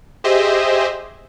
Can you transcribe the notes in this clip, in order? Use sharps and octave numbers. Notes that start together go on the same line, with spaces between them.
G4 G#4 C5 D#5 E5